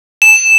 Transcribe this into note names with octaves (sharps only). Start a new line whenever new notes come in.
E7